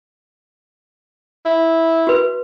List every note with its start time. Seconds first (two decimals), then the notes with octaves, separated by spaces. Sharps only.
1.46 E4
2.07 F#4 B4